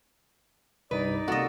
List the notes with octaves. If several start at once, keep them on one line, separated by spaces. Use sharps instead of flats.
C2 G2 G3 D#4 B4 D5
C3 A#3 F#4 A4 D#5